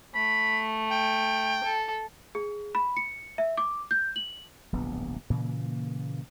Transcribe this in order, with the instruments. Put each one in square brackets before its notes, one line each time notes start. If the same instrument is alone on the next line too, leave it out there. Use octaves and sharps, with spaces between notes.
[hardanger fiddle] A3 [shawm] B5
[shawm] G5
[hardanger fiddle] A4
[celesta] G#4
B5
C#7
E5
D6
G6
F#7
[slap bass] D1 A#1 G2 B3
A#2 C#3 E3 A#3